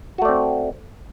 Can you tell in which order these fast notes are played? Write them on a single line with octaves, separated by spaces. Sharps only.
F#4 A3 D5 C4